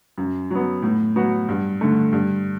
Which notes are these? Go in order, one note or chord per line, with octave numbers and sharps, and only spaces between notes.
F#2
F#3 B3
A2
F#3 B3 F#4
G2
D3 A3
G2